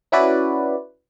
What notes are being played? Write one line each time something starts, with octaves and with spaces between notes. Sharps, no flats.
C#4 E4 F#4 B4 D5